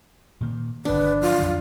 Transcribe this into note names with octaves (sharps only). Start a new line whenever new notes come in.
A#2 D#3 A#3
G1 D#3 D4 B4
F3 F4
F2 D#3 F#3